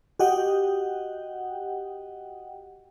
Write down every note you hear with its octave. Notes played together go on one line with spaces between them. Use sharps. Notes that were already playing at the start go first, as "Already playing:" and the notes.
F#4 G4 D#5 F#5 G5